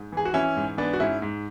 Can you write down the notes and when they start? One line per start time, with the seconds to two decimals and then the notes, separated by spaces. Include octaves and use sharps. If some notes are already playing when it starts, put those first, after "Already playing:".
Already playing: G#2
0.12 E3 G#4
0.25 F#4
0.34 E3 C#4 E4
0.56 G#2
0.77 E3 B3 D4
0.93 F#4
1.00 G#2 C#4 E4
1.22 G#2